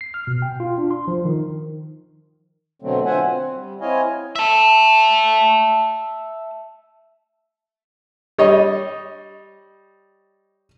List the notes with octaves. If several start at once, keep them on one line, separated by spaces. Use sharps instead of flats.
C7
F6
B2
G5
F4
D4
C6
F3
D#3
B2 D3 F#3 A3 C4
D3 F4 C5 E5 F#5 G#5
C4
G3
C4 E4 C#5 D#5 F5 G#5
E5 A5
G3 C#5 D#5